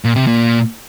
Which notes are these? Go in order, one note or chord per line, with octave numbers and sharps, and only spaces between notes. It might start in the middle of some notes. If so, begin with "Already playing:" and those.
A#2
C3
A#2